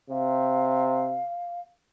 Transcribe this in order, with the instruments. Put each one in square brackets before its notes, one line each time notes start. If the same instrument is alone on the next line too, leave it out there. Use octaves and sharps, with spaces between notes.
[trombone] C3 [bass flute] F5